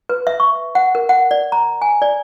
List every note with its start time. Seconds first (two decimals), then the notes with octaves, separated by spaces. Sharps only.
0.09 B4
0.27 E5
0.40 C#6
0.75 F#5
0.95 A#4
1.09 F#5
1.31 D5
1.52 A#5
1.82 G#5
2.02 D5